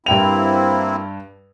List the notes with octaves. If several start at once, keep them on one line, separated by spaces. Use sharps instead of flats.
G2 A#3 C4 E4 G5 F7